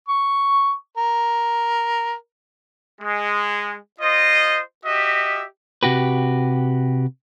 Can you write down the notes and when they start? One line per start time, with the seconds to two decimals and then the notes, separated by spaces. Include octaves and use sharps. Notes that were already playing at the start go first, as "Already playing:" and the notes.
0.09 C#6
0.97 A#4
3.01 G#3
4.01 F4 C5 D#5
4.86 F#4 G4 D#5 E5
5.83 C3 F#4 G4 B4